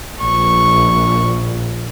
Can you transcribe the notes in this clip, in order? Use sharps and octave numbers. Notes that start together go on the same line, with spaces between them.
A#1 C#6